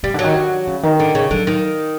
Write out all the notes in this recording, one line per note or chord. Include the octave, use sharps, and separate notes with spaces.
C#3 G3
D3 F#3
D#3
D3
C#3
D#3
D3
C#3
D3 F#3
D#3